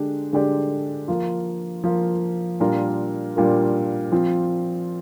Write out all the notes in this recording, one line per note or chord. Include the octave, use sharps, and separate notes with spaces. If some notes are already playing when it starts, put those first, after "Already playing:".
Already playing: D3 G#3 D4 G4
D3 G#3 D4 G4 D5
F3 A#3 F4
F3 A#3 F4
A#2 G3 D4 F4 A#4
A#2 G3 D4 F4 A#4
F3 C4 F4